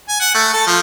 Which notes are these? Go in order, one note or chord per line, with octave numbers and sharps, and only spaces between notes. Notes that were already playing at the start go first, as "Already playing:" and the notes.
G#5
F#5
A3
A4
F3